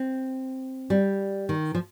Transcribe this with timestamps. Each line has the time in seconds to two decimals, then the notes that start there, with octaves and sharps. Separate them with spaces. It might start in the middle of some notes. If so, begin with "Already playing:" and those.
Already playing: C4
0.90 G3
1.49 D#3
1.75 F3